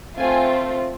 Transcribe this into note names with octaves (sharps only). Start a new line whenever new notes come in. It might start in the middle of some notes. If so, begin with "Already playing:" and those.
A3 C4 F4 G#5